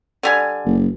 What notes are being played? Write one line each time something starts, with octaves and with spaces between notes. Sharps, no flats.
D3 G3 G#5
F#1